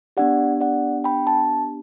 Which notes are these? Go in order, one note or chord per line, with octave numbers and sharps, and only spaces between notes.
B3 D4 G4 D5 F#5
D5 F#5
G5 B5
A5